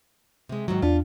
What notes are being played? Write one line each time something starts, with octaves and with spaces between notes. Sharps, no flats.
C3 G#3
G#2 D#3 F#3
E2 D4 F4